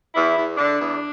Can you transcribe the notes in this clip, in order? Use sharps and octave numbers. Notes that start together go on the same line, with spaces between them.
E2 E4
E2
D3 D4
E2